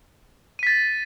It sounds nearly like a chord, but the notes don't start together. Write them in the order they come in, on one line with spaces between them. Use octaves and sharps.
D#7 B6 A6